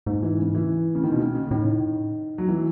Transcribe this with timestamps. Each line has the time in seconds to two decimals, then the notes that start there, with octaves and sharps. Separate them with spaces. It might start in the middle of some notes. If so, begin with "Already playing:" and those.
0.06 G#2 G#3
0.23 E3
0.39 C#3
0.55 E3
0.95 C#3
1.03 D#3
1.12 B2
1.19 C#3
1.35 C#3
1.47 C#3
1.51 A2 D#3
2.38 F#3
2.49 E3